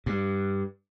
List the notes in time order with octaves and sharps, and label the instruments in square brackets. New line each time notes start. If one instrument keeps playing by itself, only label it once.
[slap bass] G2